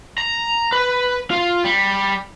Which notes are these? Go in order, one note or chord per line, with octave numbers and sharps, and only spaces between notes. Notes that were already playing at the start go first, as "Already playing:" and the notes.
A#5
B4
F4
G3